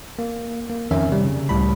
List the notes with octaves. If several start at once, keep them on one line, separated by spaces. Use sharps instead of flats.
A#3
A#3
F2 D#3 C#4 A#4 E5
C3 G3
C#3
C#2 A2 G3 B5